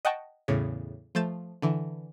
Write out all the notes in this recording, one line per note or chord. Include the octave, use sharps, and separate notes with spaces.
D#5 F#5 G5 A5 C#6
E2 A2 C#3
F3 A3 G6 A6 E7
D3 E3